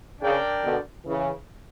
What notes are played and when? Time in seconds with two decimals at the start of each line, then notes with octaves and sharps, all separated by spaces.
0.22 C#3 D4 A#4 D5 G5
0.63 B2 D3
1.05 C#3 E3